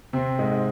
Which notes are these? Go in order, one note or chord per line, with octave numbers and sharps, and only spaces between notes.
C3 C4
G#2 G#3
G#3